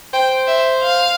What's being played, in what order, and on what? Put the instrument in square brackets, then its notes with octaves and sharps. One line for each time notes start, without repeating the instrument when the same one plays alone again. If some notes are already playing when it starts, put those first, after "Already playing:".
[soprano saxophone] C5 [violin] G5
[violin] E5
F5